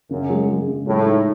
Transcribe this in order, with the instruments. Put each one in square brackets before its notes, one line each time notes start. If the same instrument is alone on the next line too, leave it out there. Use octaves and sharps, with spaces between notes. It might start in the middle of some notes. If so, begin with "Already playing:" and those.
[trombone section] F#2 [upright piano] C#3
[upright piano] G#3
G#3
C#3
[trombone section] A2 [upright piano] G#3
[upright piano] D#4